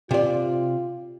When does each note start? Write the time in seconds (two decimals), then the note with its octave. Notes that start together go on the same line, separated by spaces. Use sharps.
0.11 C3 F4 D5